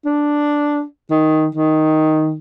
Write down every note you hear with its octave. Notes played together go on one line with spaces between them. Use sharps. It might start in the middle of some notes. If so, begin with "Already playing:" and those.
D4
D#3
D#3